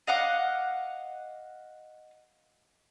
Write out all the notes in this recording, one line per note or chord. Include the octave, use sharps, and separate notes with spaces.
D#5 F5 F#5 D6